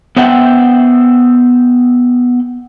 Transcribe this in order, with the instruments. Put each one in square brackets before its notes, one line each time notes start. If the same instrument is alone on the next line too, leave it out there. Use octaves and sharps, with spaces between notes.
[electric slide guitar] B3 C5 E5 F#5 G5